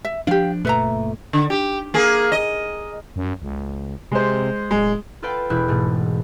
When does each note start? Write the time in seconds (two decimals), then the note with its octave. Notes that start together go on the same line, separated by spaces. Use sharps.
0.05 E5
0.27 F3 D4 G4 F5
0.65 F#1 A#2 A3 B4 E5 A#5
1.33 D3
1.50 G4
1.94 A#3 G#4
2.32 D#5
3.16 F#2
3.42 C#2
4.12 C3 G#3 C5
4.71 D1 G#3
5.22 F4 A4 B4 F5 G5 B5
5.50 E1 E4 F#6 G6
5.68 G#2 B2 A3